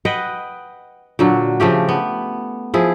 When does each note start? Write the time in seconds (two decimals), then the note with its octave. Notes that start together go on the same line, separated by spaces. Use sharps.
0.05 B4 D#5 F#5 G5
1.19 A#2 D3 F#3
1.60 C#3 F3 A3 G4
1.89 B3
2.74 F3 E4 G#4